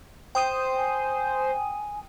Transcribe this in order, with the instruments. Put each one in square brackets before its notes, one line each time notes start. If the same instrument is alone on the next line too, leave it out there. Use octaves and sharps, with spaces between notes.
[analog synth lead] C5 [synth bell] G5 D#6 D#7
[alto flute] G#5